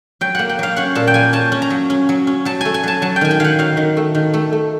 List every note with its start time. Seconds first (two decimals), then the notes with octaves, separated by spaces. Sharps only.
0.21 F#3 G5
0.35 A#3 F#5
0.49 G5
0.59 F#3 F5
0.76 C#4 F#5
0.95 A#2 A5
1.07 G5
1.14 A#3 G#5
1.33 C#4 A5
1.52 C#4
1.62 A#5
1.70 F#3
1.90 C#4
2.09 F#3
2.27 C#4
2.45 F#3 A5
2.61 A3 G#5
2.74 G#5
2.83 F#3 A5
3.02 F#3 A5
3.16 G5
3.21 D#3 G#5
3.31 G5
3.40 D#3 F5 F#5
3.59 F#3 F5
3.77 D#3
3.97 A3
4.15 D#3
4.34 A3
4.53 A3